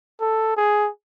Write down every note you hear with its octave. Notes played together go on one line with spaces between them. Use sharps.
A4
G#4